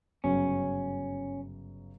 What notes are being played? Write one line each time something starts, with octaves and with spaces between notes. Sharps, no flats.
G1 F#2 C#3 F#3 C#4